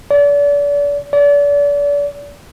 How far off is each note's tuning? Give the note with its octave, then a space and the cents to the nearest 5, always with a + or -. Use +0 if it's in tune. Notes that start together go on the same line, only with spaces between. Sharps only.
D5 -35
D5 -35